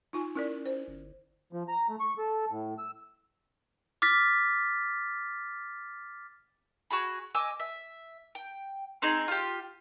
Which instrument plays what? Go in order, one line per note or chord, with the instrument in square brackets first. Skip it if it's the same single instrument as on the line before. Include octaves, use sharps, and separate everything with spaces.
[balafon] D#4 F4 G#5
[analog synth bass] C#4 [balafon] E4 A#4 D5
[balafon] C5
[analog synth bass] G1
[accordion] F3
A#5
A3
C#6
A4
A2
E6
[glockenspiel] D6 F6 A6 B6
[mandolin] F#4 G#4 B5
D#5 G#5 D6 E6
E5
G5
C4 D#4 G#4
F4 G4